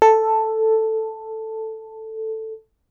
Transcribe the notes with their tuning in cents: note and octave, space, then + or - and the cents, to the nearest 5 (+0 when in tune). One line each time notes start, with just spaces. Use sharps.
A4 +5